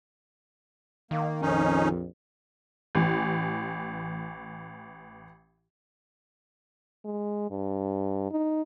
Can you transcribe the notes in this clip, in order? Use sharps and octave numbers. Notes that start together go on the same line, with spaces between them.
D#3 A#3
A#1 F2 C#4 D#4
A1 E3
G#3
G2
D#4